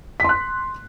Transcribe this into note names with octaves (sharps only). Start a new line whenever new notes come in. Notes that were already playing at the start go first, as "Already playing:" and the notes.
C6 F#6 B6